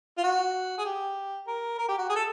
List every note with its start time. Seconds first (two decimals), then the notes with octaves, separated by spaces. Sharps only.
0.18 F4
0.23 F#4
0.78 G#4
0.85 G4
1.47 A#4
1.78 A#4
1.88 G4
1.98 F#4
2.09 G#4
2.16 A4